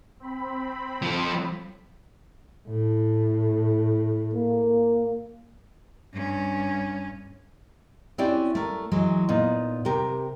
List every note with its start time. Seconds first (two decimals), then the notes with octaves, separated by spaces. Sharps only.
0.20 C4 B5
1.02 F3 A4
2.68 A2
4.34 A#3
6.13 G2 C#4
8.18 C4 C#4 E4 F#4 G4 D5
8.55 A3 A#4
8.92 E3 F#3 G#3
9.29 A#2 B3 D#4
9.85 C3 G4 A#4